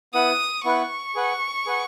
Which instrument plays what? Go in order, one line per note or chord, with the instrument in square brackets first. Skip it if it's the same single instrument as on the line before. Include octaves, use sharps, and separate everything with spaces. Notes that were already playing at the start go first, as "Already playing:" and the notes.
[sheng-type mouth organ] B3 E4 B4 F#5 [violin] D#6
[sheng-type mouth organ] B3 E4 B4 F#5 [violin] C#6
[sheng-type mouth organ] G#4 B4 F#5
G#4 B4 F#5